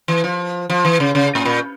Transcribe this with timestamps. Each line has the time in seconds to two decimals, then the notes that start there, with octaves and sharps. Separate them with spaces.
0.08 E3
0.24 F3
0.70 F3
0.85 E3
1.00 C#3
1.15 C#3
1.35 A2
1.45 A#2